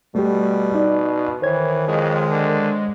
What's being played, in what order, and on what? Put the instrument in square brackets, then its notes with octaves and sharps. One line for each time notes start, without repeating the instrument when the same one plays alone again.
[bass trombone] B2 [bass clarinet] G3 [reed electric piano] A3 G4
[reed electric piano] D#4 D5
[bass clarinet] D#3 [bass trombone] E3 [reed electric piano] C5 C#5 G#6
[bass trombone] F2 [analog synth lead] G#3
[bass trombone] D3